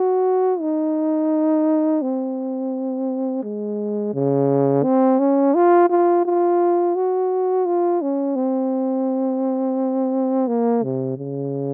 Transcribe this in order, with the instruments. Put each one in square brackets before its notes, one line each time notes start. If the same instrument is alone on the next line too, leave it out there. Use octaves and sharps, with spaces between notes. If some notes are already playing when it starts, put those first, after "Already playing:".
Already playing: [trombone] F#4
D#4
C4
G#3
C#3
C4
C#4
F4
F4
F4
F#4
F4
C#4
C4
A#3
C3
C#3